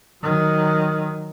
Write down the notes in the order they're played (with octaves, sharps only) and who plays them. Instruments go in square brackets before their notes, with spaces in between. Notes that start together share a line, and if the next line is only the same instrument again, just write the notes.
[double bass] D#3 F#3